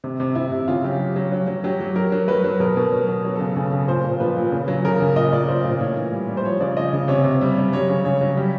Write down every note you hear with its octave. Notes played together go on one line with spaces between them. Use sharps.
C3
C3
C3 E4
C3
C#3 F4
F#3 G4
F#3
F#3
F#3
F#3
F#3 G4
F#3
F#3 A#4
F#3
F#3 B4
F#3
B2 A#4
B2
F#3
B2
F#3
C#3 A4
C#3
C#3
A#2 C5
A#2
F3 B4
A#2
C#3
F#3
C#3 A#4
C#3
A#2 D#5
A#2 D5
A#2 C5
A#2
A2 C#5
E3
G3
G3
C5
F3 C#5
C#3 D5
F3 D#5
C#3
C3 C#5
C3
G3
G3
F#3 C#5
C#3
C#3 C#5
F#3
G3 G4